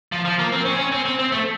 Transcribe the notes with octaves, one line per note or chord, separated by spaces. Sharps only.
F3
F3
A#3
C4
C#4
C4
C#4
C4
C4
C4
A3